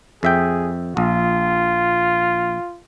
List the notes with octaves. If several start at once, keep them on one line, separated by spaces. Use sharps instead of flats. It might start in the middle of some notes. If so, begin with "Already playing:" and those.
F2 G#4 E5 G5
A#1 F4